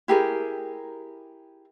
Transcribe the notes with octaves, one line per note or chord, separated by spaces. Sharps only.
E4 G4 G#4 A#4